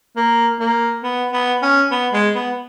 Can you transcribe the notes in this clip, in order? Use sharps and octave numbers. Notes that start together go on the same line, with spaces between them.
A#3
A#3
B3
B3
C#4
B3
G#3
B3